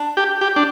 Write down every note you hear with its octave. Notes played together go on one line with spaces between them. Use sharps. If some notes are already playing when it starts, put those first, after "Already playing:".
Already playing: D4
G4
G4
D4